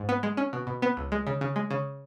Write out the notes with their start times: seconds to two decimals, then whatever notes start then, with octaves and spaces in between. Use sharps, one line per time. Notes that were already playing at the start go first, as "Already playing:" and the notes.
Already playing: G#2
0.09 B3
0.23 G#3
0.37 C#4
0.53 B2
0.67 B2
0.82 B3
0.97 C#2
1.12 G#3
1.27 C#3
1.41 C#3
1.56 G#3
1.71 C#3